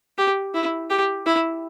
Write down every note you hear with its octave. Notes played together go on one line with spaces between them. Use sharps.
G4
E4
G4
E4